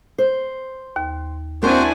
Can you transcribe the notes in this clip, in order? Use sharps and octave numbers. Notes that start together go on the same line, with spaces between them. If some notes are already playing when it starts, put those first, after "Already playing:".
C5
D#2
A#3 C4 D4 E4 F#4 C5 G#5